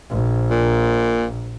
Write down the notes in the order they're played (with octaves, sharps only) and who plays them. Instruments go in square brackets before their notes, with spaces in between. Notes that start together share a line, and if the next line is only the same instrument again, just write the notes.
[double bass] A#1
[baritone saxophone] A#2